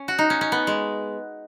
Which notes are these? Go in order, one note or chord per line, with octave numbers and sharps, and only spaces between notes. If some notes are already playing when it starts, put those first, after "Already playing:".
Already playing: C#4
F#4
D#4
C#4
C#4
B3
G#3